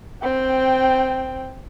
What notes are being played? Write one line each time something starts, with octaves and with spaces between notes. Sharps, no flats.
C4 G5